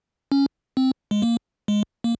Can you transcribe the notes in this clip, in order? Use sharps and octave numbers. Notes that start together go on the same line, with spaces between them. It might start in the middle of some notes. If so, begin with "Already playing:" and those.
C#4
C4
G#3
A#3
G#3
A#3